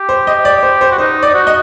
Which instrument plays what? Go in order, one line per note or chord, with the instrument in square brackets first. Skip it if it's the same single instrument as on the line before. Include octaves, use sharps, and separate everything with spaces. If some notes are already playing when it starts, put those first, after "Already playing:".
Already playing: [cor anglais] G4
[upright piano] C5
D#5
D5
C5
C5
[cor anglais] F#4
[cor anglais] D#4 [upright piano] C5
[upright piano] D5
[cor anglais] D#4
F#4
[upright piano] D#5